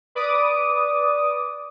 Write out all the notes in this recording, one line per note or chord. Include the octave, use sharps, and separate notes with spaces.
B4 D5 D6 D#6